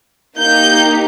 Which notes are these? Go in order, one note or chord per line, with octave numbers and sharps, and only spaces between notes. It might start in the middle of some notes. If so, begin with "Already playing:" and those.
A#3 D#4 G4 G6